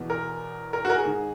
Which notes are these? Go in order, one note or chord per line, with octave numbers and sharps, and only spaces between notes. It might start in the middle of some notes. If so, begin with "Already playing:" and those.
Already playing: E2 B2
A#4
A#4
F#4
A#4
G#4
G#2 D#3